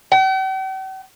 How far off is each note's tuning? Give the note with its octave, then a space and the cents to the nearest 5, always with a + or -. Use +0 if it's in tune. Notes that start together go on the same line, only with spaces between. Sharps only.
G5 -45